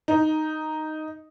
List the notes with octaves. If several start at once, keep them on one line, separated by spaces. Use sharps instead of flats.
D#4